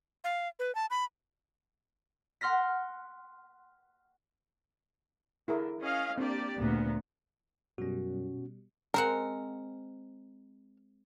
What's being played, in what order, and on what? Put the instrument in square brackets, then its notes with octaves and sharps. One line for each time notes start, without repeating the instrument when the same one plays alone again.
[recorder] F5
B4
A5
B5
[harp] F#5 C6 F6 A#6 B6
[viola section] D3 [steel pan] E4 G#4 A#4
[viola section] C#4 D#5 F5
[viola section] A#3 G4 D5 [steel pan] C4 D4
[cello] D2 A#2 [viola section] B3
[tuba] F#2 [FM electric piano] B2 G3 [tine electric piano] C#4 F#4
[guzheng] G#3 C4 F#5 [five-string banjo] A#4